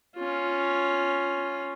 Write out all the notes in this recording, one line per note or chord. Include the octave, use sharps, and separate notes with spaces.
C#4 F4